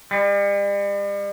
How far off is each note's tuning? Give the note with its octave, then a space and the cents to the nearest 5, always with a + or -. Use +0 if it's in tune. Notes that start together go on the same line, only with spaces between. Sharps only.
G3 +40